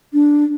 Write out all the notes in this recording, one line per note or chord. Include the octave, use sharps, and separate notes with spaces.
D4